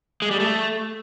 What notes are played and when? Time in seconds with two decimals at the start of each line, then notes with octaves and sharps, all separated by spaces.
0.22 G#3
0.31 G3
0.40 A3